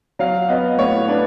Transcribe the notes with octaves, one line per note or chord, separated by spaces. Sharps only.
F#3 F5
B3 D#5
A2 C#5
D4 B4